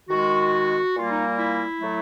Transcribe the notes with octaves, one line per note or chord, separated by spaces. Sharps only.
D#3 G#3 F#4
A#2 G3 A#3 F4
D#4
E4
A2 F#3 A3